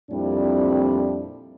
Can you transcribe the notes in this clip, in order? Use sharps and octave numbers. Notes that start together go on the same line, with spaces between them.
F2 A#2 G3 C4 D4 E4